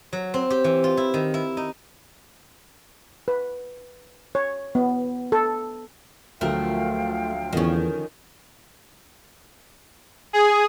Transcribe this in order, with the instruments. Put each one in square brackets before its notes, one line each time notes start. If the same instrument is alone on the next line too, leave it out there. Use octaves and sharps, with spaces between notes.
[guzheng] F#3
C4
G4
E3
F4
E4
D#3
E4
D#4
[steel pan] B4
C#5
B3
A4
[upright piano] D2 F3 F#3 [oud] A3 A#4 [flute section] F4 F5 G5
[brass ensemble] E2 [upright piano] D3 F3 [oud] D#3 C#4
[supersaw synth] G#4